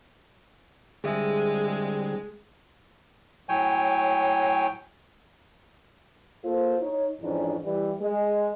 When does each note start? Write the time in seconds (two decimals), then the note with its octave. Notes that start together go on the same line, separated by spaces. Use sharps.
1.04 D3 G3 G#3 C4 G#4 E5
3.49 A2 F#3 C#5 G5 G#5
6.44 A#3 F4 A4 C5
6.81 D#4 C#5
7.21 F2 G#2 E3 C#4 D4
7.63 E3 G3
8.01 G#3